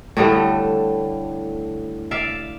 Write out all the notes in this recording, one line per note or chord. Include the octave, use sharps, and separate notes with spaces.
A2 D3 G3 A3
D5 E5 F5